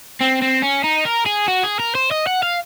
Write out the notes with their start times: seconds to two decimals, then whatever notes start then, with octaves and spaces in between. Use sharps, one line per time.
0.21 C4
0.42 C4
0.63 C#4
0.84 D#4
1.05 A#4
1.26 G#4
1.48 F#4
1.63 G#4
1.79 A#4
1.95 C5
2.11 D#5
2.27 F#5
2.43 F5